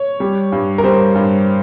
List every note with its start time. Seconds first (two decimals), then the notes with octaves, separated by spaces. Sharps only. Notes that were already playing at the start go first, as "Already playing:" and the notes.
Already playing: C#5
0.20 G3
0.52 G2
0.78 A#4
0.84 G3 C5
1.15 G2